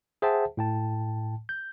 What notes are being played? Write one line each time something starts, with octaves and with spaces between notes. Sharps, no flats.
G#4 C5 E5 F#5 G5 A5
A2 G5 A5
G6